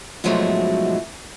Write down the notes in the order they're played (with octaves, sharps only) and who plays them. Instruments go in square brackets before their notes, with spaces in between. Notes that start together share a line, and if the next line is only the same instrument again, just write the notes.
[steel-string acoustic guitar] G#2 B2 F3 F#3 G#3 A3